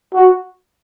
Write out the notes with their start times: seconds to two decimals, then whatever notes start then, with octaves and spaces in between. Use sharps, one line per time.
0.14 F#4